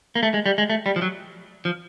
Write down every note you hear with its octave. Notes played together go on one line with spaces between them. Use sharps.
A#3
A3
G#3
G3
G#3
A3
G3
F3
F#3
F3